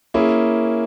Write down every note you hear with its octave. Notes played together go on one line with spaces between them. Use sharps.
A#3 C#4 E4 G#4